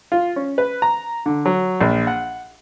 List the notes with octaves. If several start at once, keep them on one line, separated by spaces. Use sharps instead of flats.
F4
C#4
B4
A#5
D3
F#3
A#1
F#5